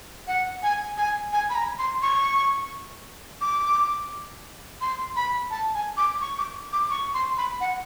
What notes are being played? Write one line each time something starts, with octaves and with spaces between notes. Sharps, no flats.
F#5
G#5
G#5
G#5
B5
A#5
C6
C#6
D6
C6
B5
A5
G#5
D6
C#6
D6
D6
C#6
C6
B5
F#5